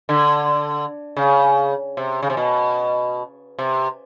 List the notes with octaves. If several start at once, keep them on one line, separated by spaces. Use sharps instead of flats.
D3
C#3
C3
C#3
C3
B2
C3